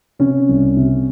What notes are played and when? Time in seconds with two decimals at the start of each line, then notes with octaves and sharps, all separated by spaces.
0.19 C3 C#4
0.49 C2
0.77 C3